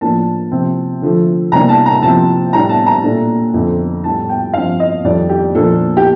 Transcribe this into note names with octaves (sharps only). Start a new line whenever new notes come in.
A2 F3 A#3 D4 A5
C3 F3 C4
D3 F3 A3
C3 G3 A#3 D4 A#5
A5
A#5
C3 F3 C4 A5
A2 G3 D4 A#5
A5
A#5
A#2 A3 D4
F2 D3 F3 A3 C4
A2 G3 D4 A5
G5
G2 F3 C4 F5
D#5
F2 D#3 G3 D5
G4
A#2 F3 A#3 D4 A4
G4